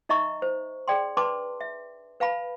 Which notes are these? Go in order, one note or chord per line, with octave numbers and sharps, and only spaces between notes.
D#4 D#5 E5 A#5 C#6
C5
G#4 D5 G5 C6
D4 B4 A5 C6 D6
E5
B4 F5 A5 B5